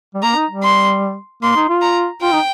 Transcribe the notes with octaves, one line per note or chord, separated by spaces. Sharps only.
G3
A#3 A#5
D#4
G3
C6
A#3 C6
D#4
F4
A#5
F4 G5
D#4